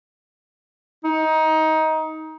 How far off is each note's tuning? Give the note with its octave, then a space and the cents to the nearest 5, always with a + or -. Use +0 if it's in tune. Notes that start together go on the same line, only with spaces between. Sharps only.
D#4 +20